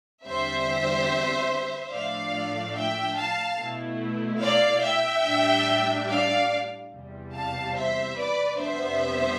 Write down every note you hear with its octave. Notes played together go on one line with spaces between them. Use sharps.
E2 D3 G3 C4 C5 E5
A2 F3 A3 D4 D5 F5
E5 G5
F5 A5
B2 A3 E4
D5 F5
E5 G5
A2 G3 D4
D5 F5
E2 C3 G3
F5 A5
C5 E5
B4 D5
F2 C3 G3 B3 D4 C5 E5